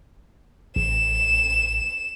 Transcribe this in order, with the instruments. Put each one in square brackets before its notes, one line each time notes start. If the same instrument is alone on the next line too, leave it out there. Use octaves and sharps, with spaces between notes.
[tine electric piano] A1 [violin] E7